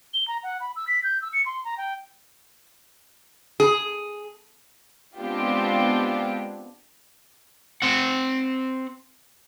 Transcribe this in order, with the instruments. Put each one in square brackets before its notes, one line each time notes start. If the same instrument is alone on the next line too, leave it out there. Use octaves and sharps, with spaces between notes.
[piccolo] G7
A#5
F#5
B5
E6
B6
G6
E6
C#7
C6
A#5
G5
[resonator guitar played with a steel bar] G#4
[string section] G#3 B3 C4 D4 F4 G4
[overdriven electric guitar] C4 F#5